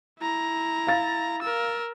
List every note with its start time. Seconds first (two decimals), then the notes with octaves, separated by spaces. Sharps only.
0.20 E4 A#5
0.87 F5 A6
1.42 A#4 E6